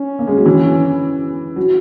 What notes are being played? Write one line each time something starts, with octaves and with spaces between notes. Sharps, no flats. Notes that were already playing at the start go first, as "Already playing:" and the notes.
Already playing: C#4
A#3
G#3
F#3
E3
F#3